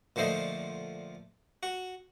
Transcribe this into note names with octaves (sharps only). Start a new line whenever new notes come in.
A#2 D3 F3 A3 C5 D#5
F#4